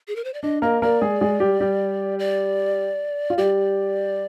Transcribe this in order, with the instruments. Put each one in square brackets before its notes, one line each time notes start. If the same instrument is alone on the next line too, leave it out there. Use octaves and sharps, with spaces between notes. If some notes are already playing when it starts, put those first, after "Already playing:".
[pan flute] G#4
A#4
C5
D5
[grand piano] D4 [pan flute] D#5
[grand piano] A#3 A#4 [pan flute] D#5
[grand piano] A#3 A#4 [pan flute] D5
[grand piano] G#3 G#4
G#3 G#4
G3 G4
G3 G4
[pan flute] D5
[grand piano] F4
[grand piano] G3 G4 [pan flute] D5